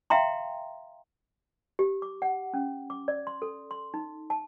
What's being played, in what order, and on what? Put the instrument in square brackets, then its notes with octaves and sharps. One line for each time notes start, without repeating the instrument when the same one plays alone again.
[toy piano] E5 F5 G5 A#5 C6
G4
D6
F#5
C#4
D6
D5
C6
A4
C6
D#4
A5